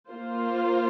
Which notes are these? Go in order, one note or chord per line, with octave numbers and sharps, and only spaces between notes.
A#3 F4 C5